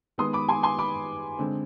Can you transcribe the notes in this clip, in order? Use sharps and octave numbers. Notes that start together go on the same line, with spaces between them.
D#3 G#3 B3 C6 D#6
B5 D6
G#5 C6
G#5 C6
B5 D6
D3 G#3 C4